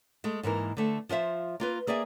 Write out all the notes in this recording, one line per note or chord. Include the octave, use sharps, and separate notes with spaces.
G#3 A3
G#2 E3 A#3 A#4
D3 A3
F3 F4 C5 E5
A#3 F4 B4
A#3 G#4 D5 E5 G#5